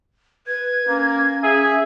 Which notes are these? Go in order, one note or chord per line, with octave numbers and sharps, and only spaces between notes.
B4 G#6
A#3 C#4
G#4 E5